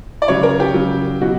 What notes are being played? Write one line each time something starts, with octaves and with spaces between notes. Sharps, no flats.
D5
C#3 F#3 C#5
A#4
G4
C#3 F#3
B2 F#3 F#4